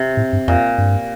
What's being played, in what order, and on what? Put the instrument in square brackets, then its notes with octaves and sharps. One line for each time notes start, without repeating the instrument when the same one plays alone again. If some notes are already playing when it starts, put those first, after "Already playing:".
Already playing: [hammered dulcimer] C3
[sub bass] A2
G2
[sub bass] F2 [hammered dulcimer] A#2
[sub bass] G2